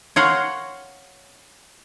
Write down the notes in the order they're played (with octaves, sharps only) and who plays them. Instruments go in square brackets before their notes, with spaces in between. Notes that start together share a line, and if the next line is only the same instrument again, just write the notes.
[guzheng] C#5 F5 F#5 A#5 C6